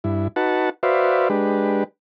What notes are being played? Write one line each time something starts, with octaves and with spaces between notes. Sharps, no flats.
G2 E4
D#4 F#4 B4 F#5 A5
F#4 B4 C5 D5 E5 F5
G#3 D4 G4 B4